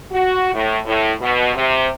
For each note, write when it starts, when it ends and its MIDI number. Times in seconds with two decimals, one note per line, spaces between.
0.12 0.50 66
0.53 0.77 45
0.85 1.12 45
1.21 1.53 47
1.55 1.87 48